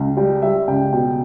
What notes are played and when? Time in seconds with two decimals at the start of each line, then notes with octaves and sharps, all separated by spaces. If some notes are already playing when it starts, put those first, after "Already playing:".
Already playing: C#2
0.17 G3 G5
0.42 G3 E5
0.68 C#2 G5
0.93 B2 G5